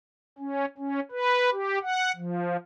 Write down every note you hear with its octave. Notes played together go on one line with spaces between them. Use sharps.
C#4
C#4
B4
G4
F#5
F3